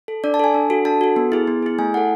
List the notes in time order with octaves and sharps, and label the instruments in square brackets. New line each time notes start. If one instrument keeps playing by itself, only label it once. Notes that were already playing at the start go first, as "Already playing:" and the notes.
[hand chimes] A4
D4 D5
A5
A4 G#5
D4
F#4 A4
D4 A5
F#4 A4
B3
E4 G#4
B3
E4 G#4
A3 G#5
E4 F#5
A4